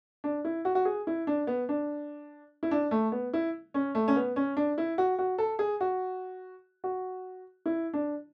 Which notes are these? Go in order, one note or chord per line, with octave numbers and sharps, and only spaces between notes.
D4
E4
F#4
F#4
G#4
E4
D4
B3
D4
E4
D4
A3
B3
E4
C#4
A3
C#4
B3
C#4
D4
E4
F#4
F#4
A4
G#4
F#4
F#4
E4
D4